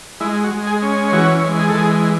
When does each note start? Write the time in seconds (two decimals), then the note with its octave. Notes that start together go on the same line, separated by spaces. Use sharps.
0.20 G#3 E4
0.44 F#4
0.51 G#3
0.67 G#4
0.82 C#4
1.12 E3 F#4
1.44 G#3
1.59 G#4
1.69 A4
1.74 E3 G#4